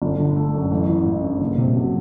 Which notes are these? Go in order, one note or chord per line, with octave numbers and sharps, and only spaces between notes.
G1
D3
A3
F#2
A1
E3
A1
G2
F#1
C3
F#3